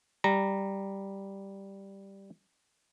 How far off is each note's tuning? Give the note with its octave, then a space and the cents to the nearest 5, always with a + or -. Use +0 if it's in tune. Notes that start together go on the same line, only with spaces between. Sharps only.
G3 +0 A#5 -10